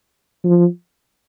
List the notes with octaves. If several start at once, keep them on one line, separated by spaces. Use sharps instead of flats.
F3